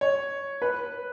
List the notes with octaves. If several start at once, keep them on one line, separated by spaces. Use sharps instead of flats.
C#5
B4